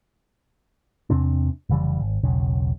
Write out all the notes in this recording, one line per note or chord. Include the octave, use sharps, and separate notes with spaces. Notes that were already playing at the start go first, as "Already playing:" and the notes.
E2 C3 C4 D4
F1 C#3 E3 G3
G#1
E1 B1 C#3